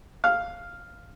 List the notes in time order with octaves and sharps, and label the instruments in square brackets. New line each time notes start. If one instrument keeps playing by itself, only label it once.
[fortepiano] F5